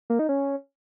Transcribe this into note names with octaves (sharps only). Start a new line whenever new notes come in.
A#3
D#4
C#4